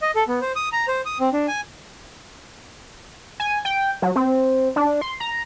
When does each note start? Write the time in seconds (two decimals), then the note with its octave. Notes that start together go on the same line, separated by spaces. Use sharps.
0.02 D#5
0.15 A4
0.28 B3
0.41 C5
0.56 D#6
0.72 A#5
0.88 C5
1.05 D#6
1.20 C4
1.33 D4
1.48 G#5
3.40 G#5
3.65 G5
4.02 F#3
4.16 C4
4.76 D4
5.01 C6
5.20 A#5